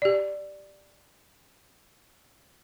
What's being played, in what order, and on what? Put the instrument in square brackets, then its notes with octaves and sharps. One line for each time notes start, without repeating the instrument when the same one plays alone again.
[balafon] G4 D5